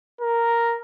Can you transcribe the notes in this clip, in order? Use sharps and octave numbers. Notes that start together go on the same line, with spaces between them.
A#4